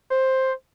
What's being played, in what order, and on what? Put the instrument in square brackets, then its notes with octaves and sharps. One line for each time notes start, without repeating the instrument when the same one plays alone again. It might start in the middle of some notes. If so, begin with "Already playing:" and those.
[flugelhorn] C5